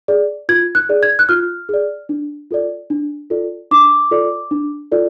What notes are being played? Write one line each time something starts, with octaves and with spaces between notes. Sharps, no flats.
G#4 D5
F4 G#6
F#6
G#4 D5
G#6
F#6
F4 F6
G#4 D5
D4
F4 A4 D5
D4
F4 A4 D5
D4 D6
F4 A4 D5
D4
F4 A4 D5